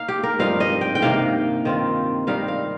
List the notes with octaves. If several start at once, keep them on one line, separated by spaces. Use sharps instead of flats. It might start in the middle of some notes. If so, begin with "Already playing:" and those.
Already playing: A#3 D#4 F5
G4
A#4
G2 F3 C4 D#4 F5
D#5
G5
G5
C3 D#3 A#3 F5
D#3 C4 F4
D#3 G3 C4 D#4 F5
F5